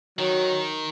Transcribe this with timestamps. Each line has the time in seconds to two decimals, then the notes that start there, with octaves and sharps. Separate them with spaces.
0.19 D#3 F#3